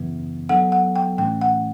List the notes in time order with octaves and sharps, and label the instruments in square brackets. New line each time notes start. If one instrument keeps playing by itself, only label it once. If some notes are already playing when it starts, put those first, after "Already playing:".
Already playing: [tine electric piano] F#2 C#3 E3 B3
[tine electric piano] F#3 B3 D4 A4 [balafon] F#5
[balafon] F#5
G5
[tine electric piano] A2 E3 A3 C#4 [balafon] G5
[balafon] F#5